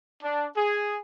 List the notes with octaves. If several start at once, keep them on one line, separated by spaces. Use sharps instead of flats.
D4
G#4